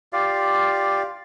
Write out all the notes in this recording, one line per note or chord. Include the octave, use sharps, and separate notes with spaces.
F4 G4 D5 F5